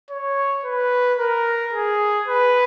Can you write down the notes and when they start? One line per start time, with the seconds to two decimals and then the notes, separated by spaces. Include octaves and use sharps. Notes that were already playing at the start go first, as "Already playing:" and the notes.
0.10 C#5
0.65 B4
1.18 A#4
1.73 G#4
2.28 B4